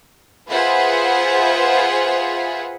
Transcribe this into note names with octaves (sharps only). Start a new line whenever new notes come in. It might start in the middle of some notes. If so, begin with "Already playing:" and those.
F4 G#4 B4 C5 E5 F#5